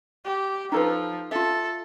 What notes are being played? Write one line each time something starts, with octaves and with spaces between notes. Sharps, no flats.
G4
F3 D#4 A4 B4
F4 A4 E5